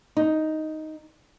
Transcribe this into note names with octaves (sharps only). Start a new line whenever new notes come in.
D#4